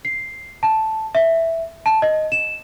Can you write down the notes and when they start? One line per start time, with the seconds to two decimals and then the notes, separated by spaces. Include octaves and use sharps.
0.05 C7
0.63 A5
1.15 E5
1.86 A5
2.02 D#5
2.32 E7